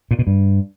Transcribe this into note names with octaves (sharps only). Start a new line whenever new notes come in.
A#2
B2
G2